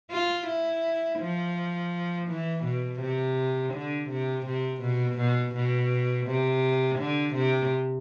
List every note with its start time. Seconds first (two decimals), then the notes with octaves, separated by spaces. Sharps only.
0.11 F4
0.47 E4
1.20 F3
2.28 E3
2.64 B2
3.00 C3
3.74 D3
4.10 C3
4.46 C3
4.81 B2
5.18 B2
5.54 B2
6.27 C3
6.99 D3
7.35 C3